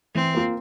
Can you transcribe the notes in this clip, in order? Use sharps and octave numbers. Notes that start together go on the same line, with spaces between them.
E3 C4
A#3 F4